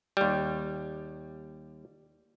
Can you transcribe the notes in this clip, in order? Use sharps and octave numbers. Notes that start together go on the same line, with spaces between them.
D#2 G3